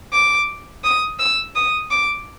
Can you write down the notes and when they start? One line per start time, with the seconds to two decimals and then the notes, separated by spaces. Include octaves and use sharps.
0.13 D6
0.84 D#6
1.19 E6
1.56 D#6
1.91 D6